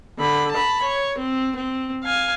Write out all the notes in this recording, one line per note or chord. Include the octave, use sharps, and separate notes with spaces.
D3 B5
A5 B5
C#5
C4
C4
F5 G#5